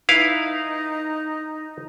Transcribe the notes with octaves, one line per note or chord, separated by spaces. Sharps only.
D#4 E4 B4 F5